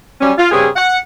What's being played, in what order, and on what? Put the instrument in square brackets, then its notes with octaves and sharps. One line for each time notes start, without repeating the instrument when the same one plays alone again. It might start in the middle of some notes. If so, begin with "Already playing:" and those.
[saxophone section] F#3 G3 C#4
F4
G2 C#3 C4 G#4
F#5